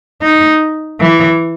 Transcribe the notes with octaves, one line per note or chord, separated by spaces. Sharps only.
D#4
E3